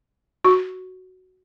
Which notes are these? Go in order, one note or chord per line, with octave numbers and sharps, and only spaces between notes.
F#4